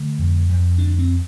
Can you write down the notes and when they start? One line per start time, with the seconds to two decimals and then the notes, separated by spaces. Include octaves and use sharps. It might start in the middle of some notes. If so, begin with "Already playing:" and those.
Already playing: D3 A3
0.19 F2
0.49 F2
0.78 D2 D4
0.99 C4